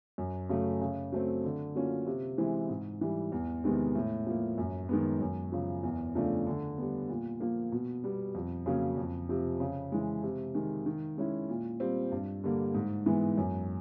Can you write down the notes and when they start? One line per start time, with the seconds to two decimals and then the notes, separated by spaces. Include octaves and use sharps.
0.18 F#2
0.49 C#3 F#3 A3
0.81 C#3
1.12 F#3 A3 C4
1.44 D3
1.75 F#3 A#3 C#4 F4
2.07 C3
2.38 E3 G#3 C4 E4
2.69 G#2
3.01 E3 G3
3.32 E2
3.64 C3 D#3 G#3 B3
3.95 A2
4.26 F3 A#3
4.58 F#2
4.89 D#3 G#3 B3
5.20 F#2
5.52 C#3 F3
5.83 E2
6.15 C#3 F3 A3 D4
6.46 D3
6.78 G3 B3
7.09 A#2
7.40 F3 A#3
7.72 B2
8.04 G3 B3
8.35 F2
8.66 C#3 F#3 A#3 C#4
8.98 F2
9.29 C3 F3
9.60 C#3
9.92 E3 G#3
10.23 C3
10.54 D#3 G#3
10.86 D#3
11.17 G#3 C#4 E4
11.49 A#2
11.80 G3 C4 F4
12.12 G2
12.44 D3 G3 A#3
12.74 G#2
13.06 E3 G#3 B3
13.38 F#2